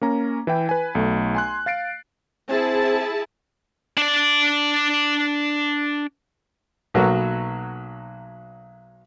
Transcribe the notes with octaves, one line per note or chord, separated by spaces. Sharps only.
A#3 C#4 A#5
E3 E4 G5
B4 G#5
B1 A3
G#5 C6 F#6
F5 A6 C7 D7
C4 E4 G#4 A5
D4 D5
B1 F#3 A#3 F#4 A4 B4